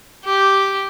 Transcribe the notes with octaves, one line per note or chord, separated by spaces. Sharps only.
G4